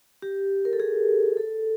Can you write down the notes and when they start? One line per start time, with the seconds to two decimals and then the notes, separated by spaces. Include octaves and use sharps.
0.22 G4
0.65 A#4
0.73 A4
0.80 G#4
1.37 A4